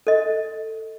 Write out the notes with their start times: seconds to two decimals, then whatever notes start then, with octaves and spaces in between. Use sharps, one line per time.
0.07 A4 D#5